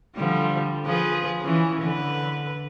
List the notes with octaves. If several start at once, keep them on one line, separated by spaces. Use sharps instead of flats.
D3 F3 G3
F3 G#4 B4
E3 C#4
D3 B4